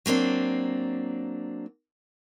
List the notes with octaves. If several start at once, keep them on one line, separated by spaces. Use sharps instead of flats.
F#3 A#3 C4 D4